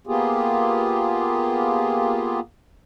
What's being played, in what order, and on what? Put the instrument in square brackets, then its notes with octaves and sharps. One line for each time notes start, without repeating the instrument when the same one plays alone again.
[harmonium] A#3 B3 F4 G4 G#4